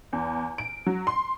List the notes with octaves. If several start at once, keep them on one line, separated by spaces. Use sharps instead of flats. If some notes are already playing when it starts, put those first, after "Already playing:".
E2
D7
F#3
C6